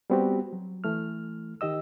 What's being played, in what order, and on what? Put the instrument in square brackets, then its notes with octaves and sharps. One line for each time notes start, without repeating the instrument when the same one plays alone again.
[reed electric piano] G3 B3 C4 F#4 G4
F#3
E3 A3 F6
D#3 G4 D#5 E6